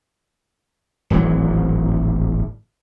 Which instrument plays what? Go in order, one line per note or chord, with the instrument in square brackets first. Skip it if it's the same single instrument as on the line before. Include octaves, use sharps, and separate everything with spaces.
[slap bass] D1 G#1 E3 F#3